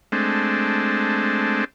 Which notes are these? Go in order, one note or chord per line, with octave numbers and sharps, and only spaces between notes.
G#3 A3 C4 D4